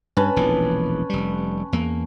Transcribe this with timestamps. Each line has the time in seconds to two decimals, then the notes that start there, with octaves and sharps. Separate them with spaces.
0.17 G2 C#4 B4 A5
0.36 E1 A#1 E3
1.10 F1 G3
1.73 E2 A#3